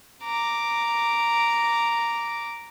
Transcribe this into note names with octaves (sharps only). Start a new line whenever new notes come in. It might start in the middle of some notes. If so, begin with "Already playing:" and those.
A#5 D6